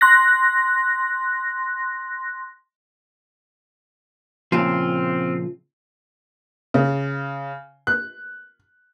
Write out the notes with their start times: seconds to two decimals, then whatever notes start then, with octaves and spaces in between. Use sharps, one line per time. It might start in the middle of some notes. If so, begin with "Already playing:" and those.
0.01 C6 F#6 A#6
4.52 A#2 C#3 F3 C4 F4
6.74 C#3
7.87 F#6